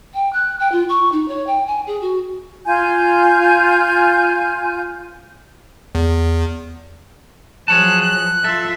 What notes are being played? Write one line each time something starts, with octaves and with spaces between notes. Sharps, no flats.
G5
F#6
G5
F4
C#6
D#4
C#5
G5
G#5
G#4
F#4
F4 G#5 G6
E2
F3 F#3 G#4 C#5 A5 F#6
F#6
F4 A4 E5